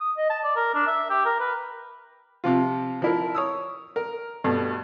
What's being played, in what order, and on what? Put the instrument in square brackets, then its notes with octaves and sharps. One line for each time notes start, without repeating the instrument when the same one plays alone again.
[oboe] D#6
D#5
A5
D5
A#4
D4
E5
G4
A#4
B4
[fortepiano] C3 F3 F4
F3 E4 A#4
C#5 D#6 E6
A#4
G2 B2 A3